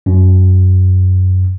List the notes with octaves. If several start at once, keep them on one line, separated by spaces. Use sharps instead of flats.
F#2